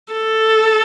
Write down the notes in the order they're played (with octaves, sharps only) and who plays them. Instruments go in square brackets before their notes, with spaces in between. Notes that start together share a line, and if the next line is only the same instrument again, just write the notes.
[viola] A4